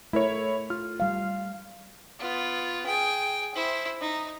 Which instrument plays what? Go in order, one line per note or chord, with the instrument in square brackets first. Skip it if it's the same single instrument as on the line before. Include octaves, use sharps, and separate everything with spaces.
[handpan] A3 [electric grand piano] E4 A#4 C#5
[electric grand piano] F4 F6
[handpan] G3 F5
[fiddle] B3 F4
G#4 G5
E4 C5
D#4